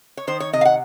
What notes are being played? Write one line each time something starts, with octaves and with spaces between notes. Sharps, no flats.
C#5
D#3 C5
C#5
C3 D#5
F5
F#5